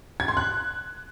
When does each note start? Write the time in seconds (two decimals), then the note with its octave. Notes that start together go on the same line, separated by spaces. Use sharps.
0.20 G#6
0.28 C6
0.37 F#6